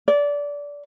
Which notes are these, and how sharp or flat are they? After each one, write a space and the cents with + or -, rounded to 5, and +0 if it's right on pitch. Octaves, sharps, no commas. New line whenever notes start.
D5 -20